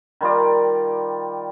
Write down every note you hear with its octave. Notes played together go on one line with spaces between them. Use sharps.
D#3 G3 F4 D5